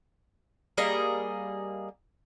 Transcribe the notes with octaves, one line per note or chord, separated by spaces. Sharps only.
G3 A#3 G#4 D#5